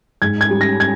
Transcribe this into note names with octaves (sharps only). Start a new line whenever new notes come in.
G#2 G#6
G#6
G3
A#6
G#6